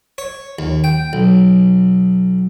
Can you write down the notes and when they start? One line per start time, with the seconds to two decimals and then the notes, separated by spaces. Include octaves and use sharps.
0.18 C#5
0.59 D#2
0.84 G5
1.13 B1